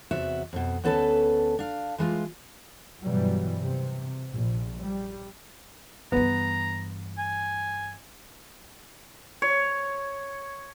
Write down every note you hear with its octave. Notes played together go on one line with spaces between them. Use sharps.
E2 C3 F#4 E5
F2 B2
D2 B3 C#4 A4 B4 A5
D4 F5
E3 G#3 F4
G2 B2 E3 F#3 G3
C3
A#1
G3
G2 E3 B3 A#5
G#5
C#5